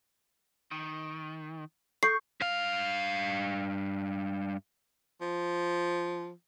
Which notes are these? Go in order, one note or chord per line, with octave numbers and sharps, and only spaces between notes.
D#3
A4 C#6 G6 C7
G2 F5
F3